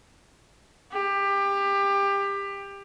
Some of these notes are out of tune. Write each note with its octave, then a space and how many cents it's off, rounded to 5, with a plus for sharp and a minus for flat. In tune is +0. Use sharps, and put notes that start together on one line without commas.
G4 +20